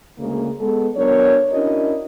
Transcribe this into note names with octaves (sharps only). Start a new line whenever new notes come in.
D2 C#3 G#3 A#3
G#3 B3 A4
F#3 B3 D4 A#4 C#5
C#4 D4 E4 F#4 A#4 D#5